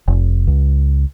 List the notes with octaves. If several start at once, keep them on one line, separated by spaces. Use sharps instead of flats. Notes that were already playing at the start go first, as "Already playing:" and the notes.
F1
C#2